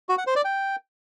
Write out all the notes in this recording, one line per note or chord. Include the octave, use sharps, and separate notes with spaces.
F#4
F#5
C5
D5
G5